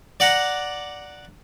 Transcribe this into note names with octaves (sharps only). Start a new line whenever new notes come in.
D5 F#5 A#5